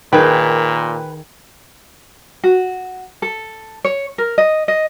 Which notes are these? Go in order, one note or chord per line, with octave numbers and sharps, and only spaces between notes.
A#2 D#3 G#4 B4 G5
F#4
A4
C#5
A#4
D#5
D#5